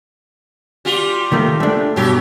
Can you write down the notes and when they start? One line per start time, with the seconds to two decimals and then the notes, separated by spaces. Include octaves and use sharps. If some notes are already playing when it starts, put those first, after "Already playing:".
0.85 G3 F4 G4
1.32 D#3 A3 A#3
1.60 A3 D4
1.96 G2 B2 F#3 G4